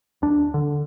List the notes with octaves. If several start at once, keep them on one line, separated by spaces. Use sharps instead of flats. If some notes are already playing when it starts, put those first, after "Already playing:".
D#2 D4
D3